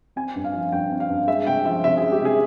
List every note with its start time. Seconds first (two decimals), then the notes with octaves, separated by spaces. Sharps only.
0.16 C4 G#5
0.35 G2
0.44 F5
0.53 F3
0.72 G2 G5
0.91 C4
1.00 F5
1.09 G2
1.27 G#3 E5
1.46 C3 G5
1.65 F3 E5
1.84 C3 E5
1.97 G#4
2.02 G#3
2.12 G4
2.21 C3 G#4